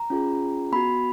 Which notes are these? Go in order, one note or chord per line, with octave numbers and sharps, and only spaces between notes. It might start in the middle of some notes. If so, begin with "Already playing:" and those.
Already playing: A#5
C#4 F4 G#4
B3 F#4 B5